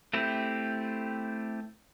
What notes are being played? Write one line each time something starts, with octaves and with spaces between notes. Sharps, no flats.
A3 C4 E4 G4